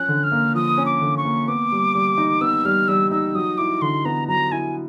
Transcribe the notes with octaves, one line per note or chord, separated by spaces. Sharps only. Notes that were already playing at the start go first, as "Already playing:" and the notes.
Already playing: F3 C#4 F#6
D3
F6
A#3
F3 D#6
C#4
D6
D3
C#6
A#3
B3 D6
G3
G3
D#4
B3 E6
G3 F6
G3 E6
D#4 E6
F#3 D#6
E4 D6
D3 C6
B3 A#5
F#3 A#5
E4 G#5